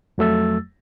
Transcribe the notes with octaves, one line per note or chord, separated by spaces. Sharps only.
F2 F#3 A3 E6 A6